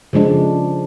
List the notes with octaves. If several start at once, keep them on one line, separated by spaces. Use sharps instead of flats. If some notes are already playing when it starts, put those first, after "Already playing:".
C#3 F3 G#3 D4